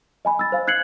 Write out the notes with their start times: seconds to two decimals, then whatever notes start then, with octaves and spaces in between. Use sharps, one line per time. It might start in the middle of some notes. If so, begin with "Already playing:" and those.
0.25 D#5 G#5 B5
0.39 E6 A6
0.52 C5 F5
0.67 F#6 G#6 C7 C#7 F#7